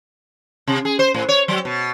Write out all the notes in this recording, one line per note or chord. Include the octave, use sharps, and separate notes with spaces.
C3
G#4
C5
A2
C#5
F#3
B2